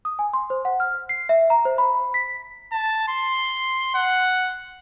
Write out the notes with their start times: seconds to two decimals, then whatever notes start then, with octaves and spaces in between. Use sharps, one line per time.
0.05 D#6
0.19 G#5
0.33 C6
0.50 C5
0.65 F#5
0.80 F6
1.09 C7
1.29 E5
1.50 A#5
1.65 C5
1.78 B5
2.14 B6
2.72 A5
3.08 C6
3.94 F#5